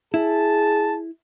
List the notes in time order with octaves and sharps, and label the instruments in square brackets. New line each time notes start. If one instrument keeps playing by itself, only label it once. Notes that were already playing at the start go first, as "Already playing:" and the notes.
[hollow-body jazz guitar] E4 [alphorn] G#4 [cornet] A5